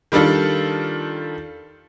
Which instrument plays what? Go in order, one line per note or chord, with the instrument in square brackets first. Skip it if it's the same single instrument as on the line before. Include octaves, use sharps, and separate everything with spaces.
[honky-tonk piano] D#3 G3 D4 F4 A4